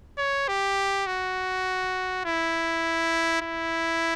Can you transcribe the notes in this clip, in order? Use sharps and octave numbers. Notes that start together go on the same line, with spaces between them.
C#5
G4
F#4
E4
E4